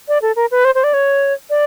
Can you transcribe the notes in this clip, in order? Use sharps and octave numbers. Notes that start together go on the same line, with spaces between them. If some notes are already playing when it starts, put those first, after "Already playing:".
D5
A4
A#4
B4
C5
C5
D5
C#5
D5